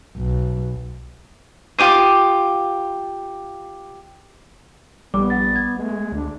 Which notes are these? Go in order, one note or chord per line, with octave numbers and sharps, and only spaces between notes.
B1
F4 G4 D6 D#6
A#1 G3 B3 D6
F#5 A6
G#6
G#3 A3
D2 D4